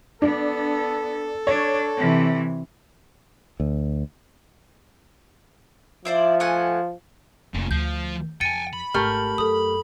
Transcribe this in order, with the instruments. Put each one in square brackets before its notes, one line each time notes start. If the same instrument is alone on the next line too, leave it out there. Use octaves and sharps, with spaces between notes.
[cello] B3 [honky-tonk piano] D4 [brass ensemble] A4
[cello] D4 [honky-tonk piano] C#5
[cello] C3 E3
[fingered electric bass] D2
[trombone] F3 [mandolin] E4 C5 D5
[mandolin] A3 F#5 G#5
[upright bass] F1 F4 [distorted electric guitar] A#2 C#3
[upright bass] D2 [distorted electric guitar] F3 [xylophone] G6
[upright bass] F2 [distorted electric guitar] G5 G#5 [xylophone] A6 C#7 D#7
[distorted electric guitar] B5
[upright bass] G#1 [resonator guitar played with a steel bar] A3 G4 A#4 [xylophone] F6
[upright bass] F#2 [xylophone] A4 D#6